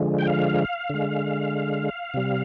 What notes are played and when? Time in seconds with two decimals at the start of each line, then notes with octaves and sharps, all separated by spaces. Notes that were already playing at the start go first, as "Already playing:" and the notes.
Already playing: D3 F3 G#3
0.19 G5
0.27 F5
0.90 D3 G#3
2.14 C3 G3